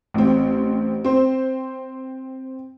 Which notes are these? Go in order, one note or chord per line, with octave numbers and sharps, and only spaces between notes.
A1 C4
C4 C5